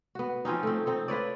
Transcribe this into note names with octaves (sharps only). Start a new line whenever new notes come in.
B3 F#4
F3 C4 C#4 D#4
A3 C4
C4 D#4 A4
F4 B4 C#5 D5